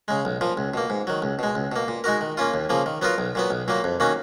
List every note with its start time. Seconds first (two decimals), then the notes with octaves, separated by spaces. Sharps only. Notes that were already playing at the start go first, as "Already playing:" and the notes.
0.08 C#3 G#3
0.25 B1
0.41 A#2 F3
0.57 C#2
0.74 B2 A#3
0.90 G#2
1.07 D#3 F#3
1.22 C#2
1.39 B2 G#3
1.55 C#2
1.72 B2 A#3
1.88 A#2
2.04 G#3 D#4 F#4 A#4
2.21 D#3
2.37 A#3 C#4 F4
2.54 D#2
2.70 C#3 F3 A#3
2.86 D#3
3.02 F#3 B3 F4 A#4
3.18 B1
3.35 A#2 F#3 B3
3.50 B1
3.68 A#2 F#3 A#3
3.84 F2
4.00 D#3 A#3 C#4 F#4